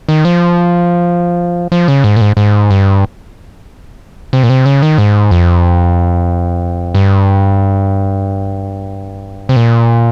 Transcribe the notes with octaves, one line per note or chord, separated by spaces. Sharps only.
D#3
F3
F3
C#3
G#2
A#2
G#2
G#2
G2
C3
A#2
C3
C#3
D#3
G#2
F2
G2
C3
A#2